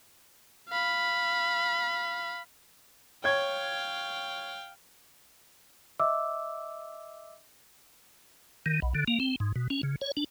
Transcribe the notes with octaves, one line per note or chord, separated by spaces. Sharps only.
F5 B5
C#5 F5 G5 G#6
D#5 E5 D6 E6
D#3
B1
D3
A#3
C4
G#2
B2
C#4
C#3
C#5
D4